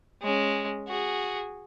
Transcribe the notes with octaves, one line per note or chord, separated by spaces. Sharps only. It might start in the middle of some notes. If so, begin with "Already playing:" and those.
G#3 C#4
F#4 G#4